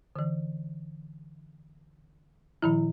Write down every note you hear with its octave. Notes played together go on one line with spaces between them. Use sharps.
D3 E3
A#2 D#3 F3 E4